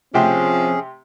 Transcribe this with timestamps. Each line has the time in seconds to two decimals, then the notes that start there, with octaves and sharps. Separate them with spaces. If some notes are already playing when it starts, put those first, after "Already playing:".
0.14 C3 F3 C4 C#4 G4 G#4